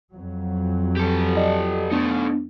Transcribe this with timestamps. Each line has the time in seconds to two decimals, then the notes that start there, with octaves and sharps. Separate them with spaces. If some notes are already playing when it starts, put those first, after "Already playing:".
0.14 F2 F#3
0.97 G4 A4
1.37 D5 D#5 A5
1.91 A3 B3 D4 D#4